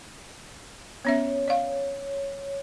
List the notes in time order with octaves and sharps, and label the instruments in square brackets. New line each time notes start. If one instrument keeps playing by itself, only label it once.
[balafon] B3 C#4 E5 [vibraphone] C#5
[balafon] D5 F5